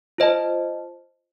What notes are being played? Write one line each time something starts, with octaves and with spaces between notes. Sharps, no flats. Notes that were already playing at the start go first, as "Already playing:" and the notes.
F4 C5 D#5 A5